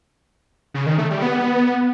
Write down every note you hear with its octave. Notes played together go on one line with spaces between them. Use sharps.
C#3
D#3
A3
G3
B3